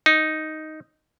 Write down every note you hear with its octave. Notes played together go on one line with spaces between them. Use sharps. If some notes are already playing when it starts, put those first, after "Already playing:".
D#4